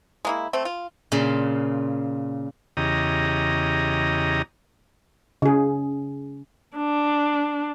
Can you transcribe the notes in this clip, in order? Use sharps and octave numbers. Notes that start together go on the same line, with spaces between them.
G#3 A#3 E4
A3 C4
F4
A#2 C#3 F4
E2 C#3 G4 D#5 A#5
C#3 G#4
D4